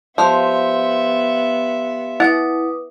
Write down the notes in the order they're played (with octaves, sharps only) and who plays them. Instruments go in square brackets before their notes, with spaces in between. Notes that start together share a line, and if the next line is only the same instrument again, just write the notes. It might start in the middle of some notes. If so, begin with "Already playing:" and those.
[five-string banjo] F3 [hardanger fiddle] B3 E5 [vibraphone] G4 F5 C6
[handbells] E4 [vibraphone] B4 D6 D#6 [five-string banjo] F#5